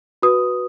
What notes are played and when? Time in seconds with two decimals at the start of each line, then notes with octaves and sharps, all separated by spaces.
0.22 F#4 B4 D#6